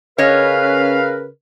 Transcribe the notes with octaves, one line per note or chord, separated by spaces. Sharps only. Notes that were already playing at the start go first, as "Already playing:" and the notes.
C#3 C#4 A#4 B4 C#5 D#5 F5